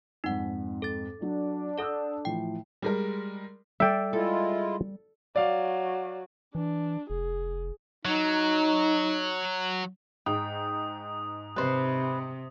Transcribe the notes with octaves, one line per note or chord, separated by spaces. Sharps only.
F2 G#2 D#4 F#5
A4 A6
F#3 D4
A4 D5 F#5 D#6 E6
A2 E3 F3 G5
G3 G#3 A#4
G3 A4 D5 E5 G5
G#3 E4 F4 A4
F#3 D5 F5
E3 D4
F1 G#4
F#3 D#4
G#2 G5 D#6
C3 B4 C5